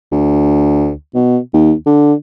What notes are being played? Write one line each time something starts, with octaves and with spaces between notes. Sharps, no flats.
D2
B2
D#2
D3